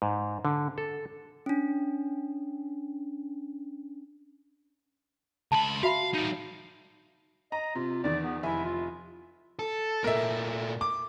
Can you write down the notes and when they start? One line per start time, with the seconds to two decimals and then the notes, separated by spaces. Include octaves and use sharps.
0.02 G#2
0.45 D3
0.78 A4
1.46 C#4 D4
5.52 C#2 A5 B5
5.83 F#4 E5 F5 B5
6.14 G3 D#4
7.52 D#5 A#5
7.75 C3 F4
8.04 E2 D#3 D5
8.24 B3
8.43 F1 E4 E5 G#5
8.64 F4
9.59 A4
10.04 A#2 A3 A#4 E5
10.81 D6